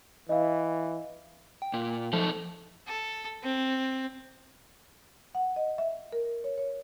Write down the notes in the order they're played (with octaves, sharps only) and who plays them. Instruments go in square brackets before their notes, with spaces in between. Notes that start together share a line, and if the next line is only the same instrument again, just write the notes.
[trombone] E3 [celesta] D#5 F5
[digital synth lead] G5
[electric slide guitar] A#2
[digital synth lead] F3 [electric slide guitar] A3 D#4 A4
[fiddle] A4
C4
[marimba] F#5
D#5
E5
A#4
C#5
C#5